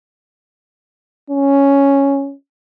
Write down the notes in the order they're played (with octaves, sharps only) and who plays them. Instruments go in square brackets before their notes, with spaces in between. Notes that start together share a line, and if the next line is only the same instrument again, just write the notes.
[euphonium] C#4